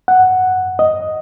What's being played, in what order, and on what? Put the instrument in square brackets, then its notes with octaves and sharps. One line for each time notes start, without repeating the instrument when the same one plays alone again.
[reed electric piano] F#5
D#5